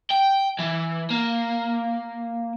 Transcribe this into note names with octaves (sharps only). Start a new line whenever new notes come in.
G5
E3
A#3